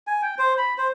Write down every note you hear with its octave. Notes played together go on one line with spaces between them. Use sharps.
G#5
G5
C5
B5
C5